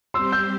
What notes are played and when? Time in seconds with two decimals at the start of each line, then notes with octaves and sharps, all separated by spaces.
0.14 G3 C4 G4 C5 C6 E6
0.32 E6 G6